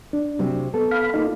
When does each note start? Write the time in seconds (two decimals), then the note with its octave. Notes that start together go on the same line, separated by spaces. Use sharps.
0.13 D4
0.39 C3 F#3 C4
0.74 B3 A4
0.91 F5 B5
1.14 A#3 D#4 F4